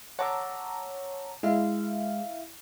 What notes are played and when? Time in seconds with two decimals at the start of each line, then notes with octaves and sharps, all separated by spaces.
0.19 C#5 F#5 A5 A#5 D6 E6
1.43 G#3 E4 E5 F5